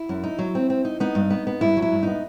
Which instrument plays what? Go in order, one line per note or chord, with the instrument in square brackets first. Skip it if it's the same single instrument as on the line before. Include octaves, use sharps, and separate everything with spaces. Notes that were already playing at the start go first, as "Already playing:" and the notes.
Already playing: [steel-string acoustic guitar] E4
F#2
D#4
F#3
C4
C4
D#4
B3 D#4
G2
B3
B3
G2 E4
F#3
E4
G2
B3 D#4